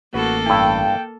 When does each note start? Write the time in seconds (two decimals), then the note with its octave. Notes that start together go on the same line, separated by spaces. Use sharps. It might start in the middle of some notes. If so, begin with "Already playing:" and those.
0.14 A1 A#3 F#4 A4 B4
0.46 G2 E4 G5